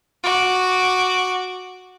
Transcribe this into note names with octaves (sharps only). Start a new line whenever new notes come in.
F#4 D6